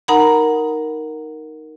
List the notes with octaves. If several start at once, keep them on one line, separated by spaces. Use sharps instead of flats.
D#4 A#4 F#5 A#5 B5